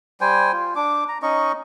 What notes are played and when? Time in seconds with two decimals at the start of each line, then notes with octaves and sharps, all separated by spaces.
0.21 G3 C5 G5 G#5
0.53 F4
0.76 D4 D6
1.09 A#5
1.22 C#4 D#4 D#5 C#6